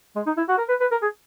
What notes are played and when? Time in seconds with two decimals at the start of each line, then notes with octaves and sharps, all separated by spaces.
0.16 G#3
0.26 D#4
0.37 E4
0.49 F#4
0.58 A#4
0.69 B4
0.80 B4
0.91 A#4
1.02 G#4